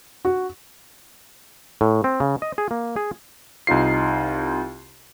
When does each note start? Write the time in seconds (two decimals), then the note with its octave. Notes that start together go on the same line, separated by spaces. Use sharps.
0.25 F#4
1.81 A2
2.04 C4
2.20 C#3
2.42 D#5
2.58 G#4
2.71 A#3
2.96 G#4
3.67 C2 D#4 F4 C7